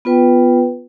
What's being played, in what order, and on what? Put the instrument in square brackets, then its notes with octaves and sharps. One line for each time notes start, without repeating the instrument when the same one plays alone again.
[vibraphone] B3 F4 B4 G5